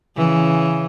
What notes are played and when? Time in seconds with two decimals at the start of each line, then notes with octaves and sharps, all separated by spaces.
0.17 C#3 E3